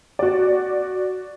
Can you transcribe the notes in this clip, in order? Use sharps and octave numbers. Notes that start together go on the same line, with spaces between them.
F#4 D5